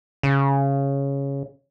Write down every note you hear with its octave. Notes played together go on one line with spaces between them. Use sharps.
C#3